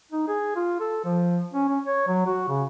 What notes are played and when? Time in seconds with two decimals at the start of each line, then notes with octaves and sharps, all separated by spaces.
0.12 D#4
0.28 G#4
0.56 F4
0.81 A4
1.05 F3
1.53 C#4
1.68 C#4
1.84 C#5
2.08 F#3
2.26 F#4
2.49 C#3